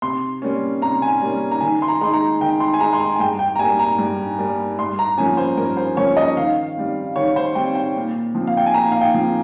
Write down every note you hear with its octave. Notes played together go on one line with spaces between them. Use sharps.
C3 C6
G3 A#3 C#4
C3 A#5
G#5
G3 A#3 C#4
A#5
D#3 G#5
C6
A#5
G#3 D#4 C6
A#5
D#3 G5
C6
G#5
G#3 D#4 A#5
C6
A#5
G#5
G2 G5
G5
A#5
G3 A#3 G#5
A#5
G2
G3 A#3
G2 C6
A#5
F3 A#3 C#4 G#5
C5
G2 A#4
C5
F3 A#3 C#4 C#5
D#5
D#3 F5
G3 C4
D#3 C#5
C5
G3 C4 G5
G5
A#2
F3 C4
F5
G5
G#5
A#2 A#5
F5
G5
F3 C4